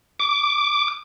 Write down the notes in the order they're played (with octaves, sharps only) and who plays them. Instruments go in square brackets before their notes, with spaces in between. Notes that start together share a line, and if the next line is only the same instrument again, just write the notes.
[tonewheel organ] D6